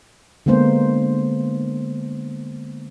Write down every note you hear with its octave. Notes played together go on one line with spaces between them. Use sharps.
D3 G#3 A#3 B3 C5